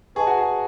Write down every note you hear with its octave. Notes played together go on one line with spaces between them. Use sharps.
G#4 B4 D#5 A5 C#6
F#4
G#4